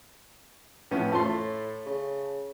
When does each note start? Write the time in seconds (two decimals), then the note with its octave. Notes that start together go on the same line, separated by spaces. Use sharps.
0.91 F2 A2 B3 C#4
1.12 F3 A3 C6
1.25 A2
1.86 C#3